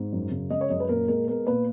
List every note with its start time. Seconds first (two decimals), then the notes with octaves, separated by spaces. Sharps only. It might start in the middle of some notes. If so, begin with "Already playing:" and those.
Already playing: G#2
0.13 F#2
0.31 C#3
0.50 G#3 D#5
0.61 C#5
0.70 F#2 D#5
0.80 B4
0.89 A#2 A#4
1.08 G#3 A#4
1.28 B3 A#4
1.47 A#2 B4